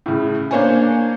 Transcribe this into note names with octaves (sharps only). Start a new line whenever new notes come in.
A2 C#3
A#3 D4 C5 C#5 F5 G#5